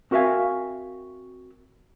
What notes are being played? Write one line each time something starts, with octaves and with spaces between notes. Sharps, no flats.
C4 F#4 A#4 E5 F5 G#5